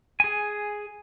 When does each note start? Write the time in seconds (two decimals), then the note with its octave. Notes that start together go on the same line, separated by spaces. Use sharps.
0.20 G#4 G#5